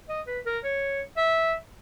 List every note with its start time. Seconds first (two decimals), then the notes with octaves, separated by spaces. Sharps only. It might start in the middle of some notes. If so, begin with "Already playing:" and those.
0.09 D#5
0.27 B4
0.46 A#4
0.64 C#5
1.17 E5